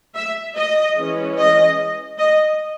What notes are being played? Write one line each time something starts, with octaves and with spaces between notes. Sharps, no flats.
E5
D#5
E3 G#3 C#4
D#5
D#5